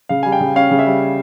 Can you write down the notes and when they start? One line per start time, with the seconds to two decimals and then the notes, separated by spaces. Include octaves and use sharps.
0.09 C#3 F5
0.23 G3 G#5
0.32 G5
0.40 C#3
0.56 C#4 F5
0.71 C#3
0.79 E5
0.86 G3